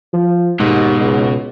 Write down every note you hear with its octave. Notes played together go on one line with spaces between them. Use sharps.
F3
D#2 G#2 B2
C#2